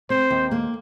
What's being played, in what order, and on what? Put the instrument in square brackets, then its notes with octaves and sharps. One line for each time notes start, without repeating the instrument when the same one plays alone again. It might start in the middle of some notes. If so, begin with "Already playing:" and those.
[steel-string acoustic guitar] C4 [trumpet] C5
[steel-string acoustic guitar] D#2
A#3